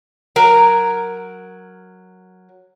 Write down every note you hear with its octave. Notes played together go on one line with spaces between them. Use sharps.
F#3 A#4 A#5